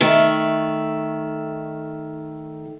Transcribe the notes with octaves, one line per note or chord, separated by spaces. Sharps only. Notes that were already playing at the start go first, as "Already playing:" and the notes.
D#3 A3